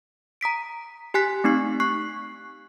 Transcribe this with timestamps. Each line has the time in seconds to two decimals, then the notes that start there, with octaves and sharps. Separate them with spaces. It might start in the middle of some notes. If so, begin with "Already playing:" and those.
0.41 A#5 D#6 B6 D7
1.14 G4 G#5 F#6 B6
1.44 A3 C4 D#4 C#6 C7
1.80 C#6 F#6 C7